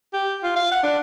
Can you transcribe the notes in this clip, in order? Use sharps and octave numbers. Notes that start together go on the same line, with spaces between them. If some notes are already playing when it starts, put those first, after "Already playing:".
G4
F4
F5
F#5
D4